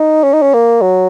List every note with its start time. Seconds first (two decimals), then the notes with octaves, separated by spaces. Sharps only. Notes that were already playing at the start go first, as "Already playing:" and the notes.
Already playing: D#4
0.23 C#4
0.33 D#4
0.42 C#4
0.54 A#3
0.82 F#3